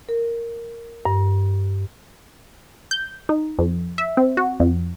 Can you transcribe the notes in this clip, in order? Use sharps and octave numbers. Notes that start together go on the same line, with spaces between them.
A#4
G2
G6
D#4
F2
E5
C4
F#4
F2